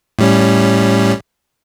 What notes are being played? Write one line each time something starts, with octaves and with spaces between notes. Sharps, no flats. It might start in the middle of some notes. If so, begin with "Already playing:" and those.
A2 G3 C#4